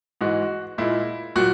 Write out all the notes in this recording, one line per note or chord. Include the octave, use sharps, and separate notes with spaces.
G#2 E3 G#3 F#4
A#2 G#3 E4
A#2 F#3 F#4